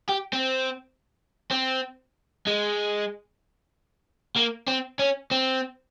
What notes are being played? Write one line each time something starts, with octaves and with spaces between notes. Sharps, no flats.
G4
C4
C4
G#3
A#3
C4
C#4
C4